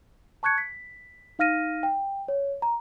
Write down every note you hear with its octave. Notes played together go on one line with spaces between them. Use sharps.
A5 C#6 F#6 G#6 C#7
B6
D#4 F5 F6 A#6 D#7
G5
C#5
A#5